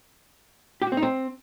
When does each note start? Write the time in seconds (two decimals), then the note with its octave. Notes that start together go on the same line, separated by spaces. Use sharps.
0.82 G4
0.87 F#4
0.92 C4
0.97 D#4
1.02 C4